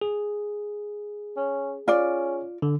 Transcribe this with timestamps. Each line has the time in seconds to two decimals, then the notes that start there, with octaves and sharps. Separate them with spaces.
0.01 G#4
1.37 C#4
1.88 C#4 F4 D5
2.62 D3